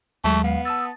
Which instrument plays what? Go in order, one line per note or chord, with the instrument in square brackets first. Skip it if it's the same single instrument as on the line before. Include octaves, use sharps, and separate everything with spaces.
[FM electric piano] D#2 F#3 G#3 [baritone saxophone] A3 [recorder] C#6
[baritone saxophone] B3 [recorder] F5
[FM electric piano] A5 D#6 A6 [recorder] E6